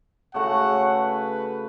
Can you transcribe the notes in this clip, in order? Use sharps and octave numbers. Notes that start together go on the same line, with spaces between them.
C#3 A3 F#4 F#5
B4